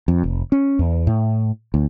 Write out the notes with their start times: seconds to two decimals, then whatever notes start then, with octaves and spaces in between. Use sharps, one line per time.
0.08 F2
0.24 F1
0.52 C#4
0.79 E2
1.07 A2
1.74 D2